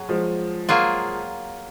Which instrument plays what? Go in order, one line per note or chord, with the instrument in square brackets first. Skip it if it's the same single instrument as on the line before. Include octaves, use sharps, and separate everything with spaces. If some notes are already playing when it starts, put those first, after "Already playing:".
Already playing: [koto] F#3 G#4
[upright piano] F3 G#3
[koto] F#3 A#3 F4 G#4